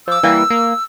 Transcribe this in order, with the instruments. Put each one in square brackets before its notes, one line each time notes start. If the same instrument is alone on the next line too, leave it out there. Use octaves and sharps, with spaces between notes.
[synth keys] F3 D6 [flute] E6
[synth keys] E3 G3 A#3
A#3